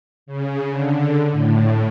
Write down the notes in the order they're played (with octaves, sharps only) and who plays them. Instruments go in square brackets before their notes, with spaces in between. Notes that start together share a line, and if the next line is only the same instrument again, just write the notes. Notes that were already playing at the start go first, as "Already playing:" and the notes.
[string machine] C#3
D3
A2